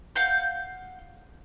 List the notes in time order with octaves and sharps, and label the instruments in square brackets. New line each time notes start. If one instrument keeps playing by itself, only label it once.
[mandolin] F5 F#5 G6